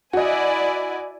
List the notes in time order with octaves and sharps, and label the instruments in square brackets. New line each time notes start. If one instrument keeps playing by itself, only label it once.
[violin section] E4 D5 G#5 [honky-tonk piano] F#4 D#5